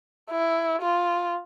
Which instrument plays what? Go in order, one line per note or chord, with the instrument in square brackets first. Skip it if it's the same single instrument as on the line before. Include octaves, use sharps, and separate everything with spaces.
[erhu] E4
F4